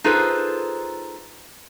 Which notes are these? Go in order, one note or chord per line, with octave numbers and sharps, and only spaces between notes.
D#4 F4 G#4 A4 B4 C5